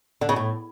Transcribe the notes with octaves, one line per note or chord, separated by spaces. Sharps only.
D3
C#3
A2